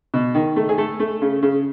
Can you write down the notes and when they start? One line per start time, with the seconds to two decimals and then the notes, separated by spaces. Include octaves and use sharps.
0.14 B2
0.35 D#3
0.56 A3
0.69 G#4
0.78 A3 A4
1.00 A3
1.22 C#3
1.43 C#3